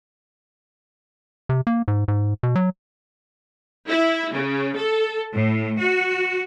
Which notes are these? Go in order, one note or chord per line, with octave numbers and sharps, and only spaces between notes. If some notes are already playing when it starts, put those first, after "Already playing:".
C3
A#3
G#2
G#2
B2
F#3
E4
C#3
A4
A2
F#4